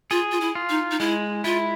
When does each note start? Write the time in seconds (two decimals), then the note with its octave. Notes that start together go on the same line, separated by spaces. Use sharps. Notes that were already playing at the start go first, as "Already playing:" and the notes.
0.11 F4 G#4
0.32 F4
0.40 E4
0.55 F4
0.69 D#4
0.91 D#4
1.00 G#3 E4
1.44 E4 F4